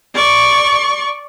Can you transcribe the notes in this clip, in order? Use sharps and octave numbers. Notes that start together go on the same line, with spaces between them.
D5 C#6